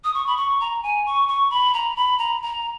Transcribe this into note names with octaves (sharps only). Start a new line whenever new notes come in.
D#6
C#6
B5
C#6
A#5
G#5
C#6
C#6
B5
A#5
B5
A#5
A#5